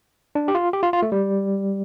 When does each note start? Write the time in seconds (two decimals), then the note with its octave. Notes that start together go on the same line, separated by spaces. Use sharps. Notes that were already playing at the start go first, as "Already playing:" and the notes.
0.35 D4
0.48 G4
0.55 F4
0.73 G4
0.83 F4
0.93 F4
1.02 A3
1.12 G3